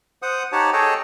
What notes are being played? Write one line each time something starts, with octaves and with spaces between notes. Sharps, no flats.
C5 F#5 D#6
D#4 G4 C#5 F#5 A5
G#4 A4 C#5 D#5 G5 A5